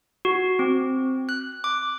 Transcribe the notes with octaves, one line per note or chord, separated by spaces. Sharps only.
F#4
C4
F#6
D6